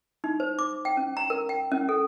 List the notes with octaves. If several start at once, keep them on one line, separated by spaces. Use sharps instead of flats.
D#4
C5
D6
G5
C#4
A#5
A#4
G5
C#4
A4